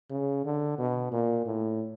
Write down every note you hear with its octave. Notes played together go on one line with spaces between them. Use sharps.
C#3
D3
B2
A#2
A2